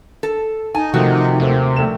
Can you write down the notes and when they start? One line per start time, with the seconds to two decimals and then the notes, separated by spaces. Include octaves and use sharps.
0.23 A4
0.75 D#4 G#5 A5
0.94 C3 D#3 F3 A3 F#4
1.40 D#2 C3 A3 C4
1.76 A#1 A3 E7